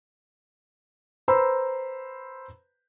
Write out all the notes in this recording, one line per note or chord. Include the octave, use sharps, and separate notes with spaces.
B4 C5 A#5 B5 E6